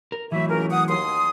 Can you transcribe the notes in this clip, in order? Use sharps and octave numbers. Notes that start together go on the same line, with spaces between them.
A#4
E3 F#3 A3 E4 E5
C#2 C#4 A#4
F#5 D#6
D#2 C6 D#6